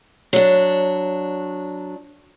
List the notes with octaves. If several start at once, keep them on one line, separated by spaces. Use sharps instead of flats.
F#3 D4